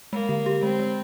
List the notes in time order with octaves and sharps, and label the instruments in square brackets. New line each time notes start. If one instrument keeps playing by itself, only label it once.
[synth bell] G#3 [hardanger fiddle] A#3
[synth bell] D3
G4
[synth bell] G#3 [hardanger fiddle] C4
[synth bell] G#3